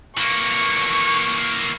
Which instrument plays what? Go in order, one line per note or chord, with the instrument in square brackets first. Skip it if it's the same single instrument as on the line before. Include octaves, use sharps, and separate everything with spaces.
[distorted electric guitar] E3 A#3 [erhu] C#6